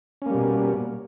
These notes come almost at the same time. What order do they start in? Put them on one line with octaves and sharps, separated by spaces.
C#4 A#3 G3 B2